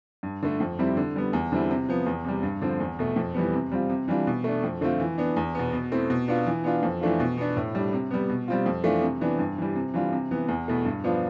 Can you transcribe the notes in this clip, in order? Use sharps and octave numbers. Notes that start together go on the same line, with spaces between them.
G2
D3 A3
F2
C3 G3 C4 E4
D3
G3 B3
E2
D3 G3 C4 E4
C3
F3 B3
E2
C3 G3
G2
D3 F3 C4
E2
B2 A3
F2
E3 G3 B3
C3
G3 C4 F4
C3
E3 G3 D4 F4
B2
A3 D4
F2
D3 A3 C4 F4
E3
B3 D4
E2
B2 B3
B2
A3 C4 E4
B2
B3 D4 F4
E3
B3 D4 F4
F2
E3 A3 D4 F4
B2
B3 D4
A2
G3 D4
C3
G3 B3
B2
G3 C4 F4
F2
E3 A3 D4 F4
C3
E3 B3 D4
G2
E3 G3
C3
E3 G3 D4 F4
C3
E3 B3
E2
B2 A3 E4
G2
F3 B3 D4 F4